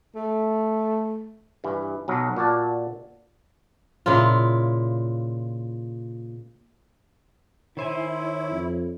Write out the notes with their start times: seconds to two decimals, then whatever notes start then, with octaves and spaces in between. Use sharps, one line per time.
0.15 A3
1.64 G2 E3
2.08 B1 F#3
2.37 A#2 F#4 D5 A5
4.06 A#2 C#3 E4 F4
7.77 D#3 E4 C5 C#5 G#5
8.51 F2